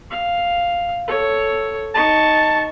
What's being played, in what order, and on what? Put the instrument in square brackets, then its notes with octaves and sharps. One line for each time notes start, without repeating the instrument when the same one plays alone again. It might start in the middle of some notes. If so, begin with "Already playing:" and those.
[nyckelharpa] F5
A4 C#5
[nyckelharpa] D#4 C#6 [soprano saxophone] A5